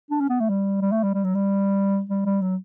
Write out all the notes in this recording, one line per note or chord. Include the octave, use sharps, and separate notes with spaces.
D4
C#4
B3
A3
G3
G3
A3
G3
G3
F#3
G3
G3
G3
F#3